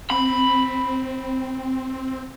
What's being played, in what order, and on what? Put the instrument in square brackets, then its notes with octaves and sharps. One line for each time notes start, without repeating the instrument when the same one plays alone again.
[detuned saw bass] C4 [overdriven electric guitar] B5